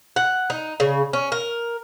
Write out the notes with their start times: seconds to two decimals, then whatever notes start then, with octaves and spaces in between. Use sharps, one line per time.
0.16 F#5
0.50 D#4
0.80 C#3
1.13 C#4
1.32 A#4